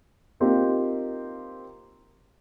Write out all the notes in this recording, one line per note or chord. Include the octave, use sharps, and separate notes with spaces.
A#3 C4 D#4 F4 G4 A#4